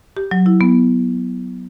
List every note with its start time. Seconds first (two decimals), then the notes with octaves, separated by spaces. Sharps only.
0.17 G4
0.31 F#3
0.46 E4
0.61 B3